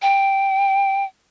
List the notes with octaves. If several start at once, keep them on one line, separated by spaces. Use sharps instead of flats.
G5